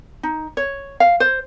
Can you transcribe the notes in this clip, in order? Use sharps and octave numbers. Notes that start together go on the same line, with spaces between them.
D#4
C#5
F5
C5